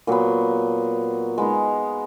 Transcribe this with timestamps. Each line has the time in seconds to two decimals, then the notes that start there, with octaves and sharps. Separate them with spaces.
0.07 A#2 F#3 B3
1.38 G#3 B3 D#4